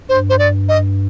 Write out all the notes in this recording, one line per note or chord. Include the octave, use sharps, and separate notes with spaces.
G2 C5
C5
D5
D#5